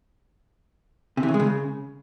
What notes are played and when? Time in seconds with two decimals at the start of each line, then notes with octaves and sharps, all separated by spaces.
1.17 C3
1.23 E3
1.28 C#3
1.34 G#3
1.40 C#3